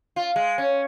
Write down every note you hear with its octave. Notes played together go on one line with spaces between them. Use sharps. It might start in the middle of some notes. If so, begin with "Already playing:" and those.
F4
G#3
C#4